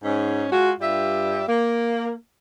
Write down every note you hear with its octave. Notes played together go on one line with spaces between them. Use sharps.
G#2 C#4
G#3 F4 F#4
G2 G3 F4 E5
A#3